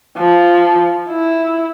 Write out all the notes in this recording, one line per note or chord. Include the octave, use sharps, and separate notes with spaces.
F3
E4